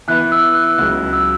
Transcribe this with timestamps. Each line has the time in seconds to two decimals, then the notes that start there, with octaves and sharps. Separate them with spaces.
0.08 E3 B3 E4 B4 F#6
0.32 E6
0.55 F#6
0.78 C#2 C#3 F#3 F#6
1.13 E6